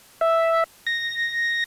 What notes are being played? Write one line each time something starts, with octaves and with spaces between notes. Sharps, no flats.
E5
A#6